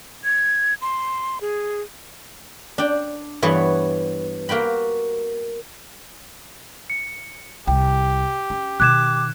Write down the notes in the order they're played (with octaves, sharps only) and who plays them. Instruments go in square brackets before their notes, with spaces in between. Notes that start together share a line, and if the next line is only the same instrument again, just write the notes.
[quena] G#6
C6
G#4
[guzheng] D4 G5
G2 E3 B3 C#5 A5
A#3 F#4 G5 B5
[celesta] C#7
[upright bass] C2 [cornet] G4 [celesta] G5
[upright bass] C#4
[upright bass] B2 D#3 [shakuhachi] D6 [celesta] F#6 G#6 E7